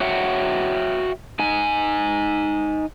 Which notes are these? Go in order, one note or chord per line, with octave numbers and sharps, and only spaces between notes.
F#4 C#5 E5 F#5 G5
D#4 G#5